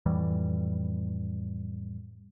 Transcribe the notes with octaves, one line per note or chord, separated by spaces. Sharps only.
F2 A2 E3 G3